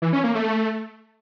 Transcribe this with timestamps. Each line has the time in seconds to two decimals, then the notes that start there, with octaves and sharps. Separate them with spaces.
0.02 E3
0.13 C#4
0.24 A#3
0.35 A3